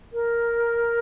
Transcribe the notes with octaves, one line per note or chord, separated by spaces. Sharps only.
A#4